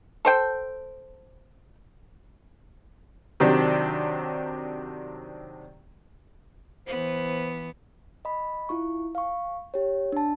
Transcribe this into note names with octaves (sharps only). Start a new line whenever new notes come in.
A4 C5 G5
C3 D#3 F#3 C4 D4 G4
E3 B3 C5
D#5 B5
E4 F4 C#6
F5 C#6
G4 C#5
D4 A5